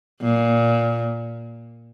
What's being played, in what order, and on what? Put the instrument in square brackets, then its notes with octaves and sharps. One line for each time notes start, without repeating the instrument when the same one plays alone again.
[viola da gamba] A#2